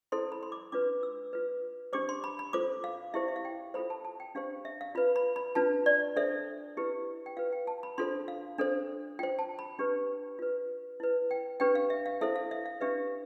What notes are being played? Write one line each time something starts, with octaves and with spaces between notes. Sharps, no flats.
E4 A4 C5 C6
B5
C6
D6
D4 F4 B4 D6
E6
F4 B4
D4 G4 C5 D6
C6
B5
B5
F4 A4 C5 D6
F5
E4 G4 C5 E5
E5
F5
G5
F4 A4 C5 B5
A5
A5
G5
D4 G4 C5 F5
E5
F5
F4 B4 B5
B5
B5
D4 F4 B4 A5
D5
D4 A4 C5 E5
E4 G4 B4
G5
F4 B4 F5
G5
A5
B5
D4 F4 A4 C5 C6
F5
D4 A4 C5
F4 C5 G5
A5
B5
D4 G4 B4
F4 B4
E4 B4
G5
D4 G4 B4 G5
F5
E5
F5
E4 A4 C5 E5
F5
E5
F5
D4 G4 B4 E5